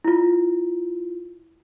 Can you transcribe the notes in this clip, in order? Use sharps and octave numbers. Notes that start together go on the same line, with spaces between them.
E4 F4